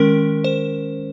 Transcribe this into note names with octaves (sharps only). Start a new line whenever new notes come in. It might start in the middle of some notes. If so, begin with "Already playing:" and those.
Already playing: D#3 G#3 C#4 A#4
C5